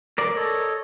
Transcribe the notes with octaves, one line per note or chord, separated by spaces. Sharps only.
A#4 D5
A4 C#5 D#5